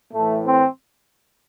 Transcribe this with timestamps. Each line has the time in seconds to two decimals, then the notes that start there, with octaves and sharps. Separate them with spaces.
0.13 A2 E3 A3
0.45 C4